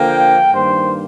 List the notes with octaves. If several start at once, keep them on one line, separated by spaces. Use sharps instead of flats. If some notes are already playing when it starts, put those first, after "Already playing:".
Already playing: D3 F3 A#3 G5
G2 D#3 A#3 C5